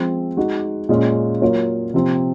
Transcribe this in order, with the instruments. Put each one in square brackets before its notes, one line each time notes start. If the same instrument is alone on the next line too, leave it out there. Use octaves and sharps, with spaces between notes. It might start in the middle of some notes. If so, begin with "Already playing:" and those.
Already playing: [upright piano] F3 G#3 C4
G#3 D#4 F#4
A#2 G#3 C#4
F#3 A#3 F4 A#4 C#5
C3 F3 C4